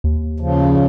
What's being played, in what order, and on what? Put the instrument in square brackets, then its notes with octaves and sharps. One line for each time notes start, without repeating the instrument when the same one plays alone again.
[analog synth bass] D#2
[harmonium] C#3 F3